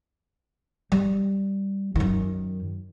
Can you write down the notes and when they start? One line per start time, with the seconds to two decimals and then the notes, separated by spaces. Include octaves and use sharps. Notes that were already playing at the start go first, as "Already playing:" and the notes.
0.92 G3
1.96 F#2 D#3